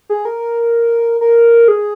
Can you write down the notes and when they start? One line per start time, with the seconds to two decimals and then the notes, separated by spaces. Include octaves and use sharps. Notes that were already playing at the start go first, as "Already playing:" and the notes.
0.10 G#4
0.25 A#4
1.21 A#4
1.68 G#4